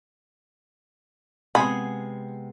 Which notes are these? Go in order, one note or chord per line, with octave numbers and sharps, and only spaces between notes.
C3 G#3 B3 G#4 B5